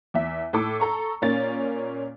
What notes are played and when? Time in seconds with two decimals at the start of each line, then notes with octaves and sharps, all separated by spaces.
0.14 E2 E5
0.53 A2 A4 D6
0.80 A4 A#5 C#6
1.22 A#2 A#3 C#4 A6